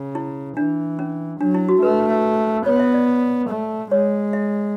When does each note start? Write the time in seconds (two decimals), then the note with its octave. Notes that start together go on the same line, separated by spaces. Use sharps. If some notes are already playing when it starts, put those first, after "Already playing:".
Already playing: C#3
0.15 E4
0.57 E3 D4
0.99 C#4
1.41 F#3 D4
1.54 E4
1.69 F#4
1.82 A3 B4
2.66 B3 C#5
2.80 E5
2.94 D5
3.50 A3
3.91 G#3 C#5
4.33 E5